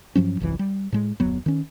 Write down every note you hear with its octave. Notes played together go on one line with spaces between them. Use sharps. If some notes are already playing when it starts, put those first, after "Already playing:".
G2 F3 F#3 C#4
G1 C2 F#2 E3
G3
A2 G#3
D1 F2 F#3 B3
D#3 C#4